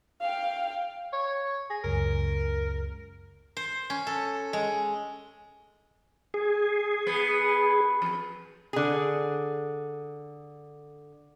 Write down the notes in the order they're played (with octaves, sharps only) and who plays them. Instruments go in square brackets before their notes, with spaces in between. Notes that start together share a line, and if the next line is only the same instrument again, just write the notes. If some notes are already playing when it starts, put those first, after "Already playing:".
[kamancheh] F5 G5
[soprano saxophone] C#5
[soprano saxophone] G#4 [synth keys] A#6
[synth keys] C#2 F#2 C#3 [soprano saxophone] A#4
[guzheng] C5
C#4
A4
G#3
[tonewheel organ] G#4
[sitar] B3
F2
[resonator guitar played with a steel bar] D3 G#4